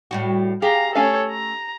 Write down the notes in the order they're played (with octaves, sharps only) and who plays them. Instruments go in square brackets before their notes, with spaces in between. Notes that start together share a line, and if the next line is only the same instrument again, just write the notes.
[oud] A2 G3 F#4
[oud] G4 [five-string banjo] G#4 [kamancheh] F5 A#5
[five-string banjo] A3 C#4 F5 [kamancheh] A4 C#5
[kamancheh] A#5